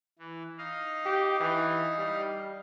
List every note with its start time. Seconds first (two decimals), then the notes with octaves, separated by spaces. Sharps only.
0.19 E3
0.58 D#4 D#5 F5
1.06 G4
1.40 E3
1.98 G3